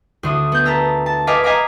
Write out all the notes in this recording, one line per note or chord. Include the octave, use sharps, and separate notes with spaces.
D2 D3 D#6
B3 G6
B4 A5 A#5 E6
A5
B4 D#5 F5 G#5 B5 D6
D#5 F5 G#5 A#5 B5 D6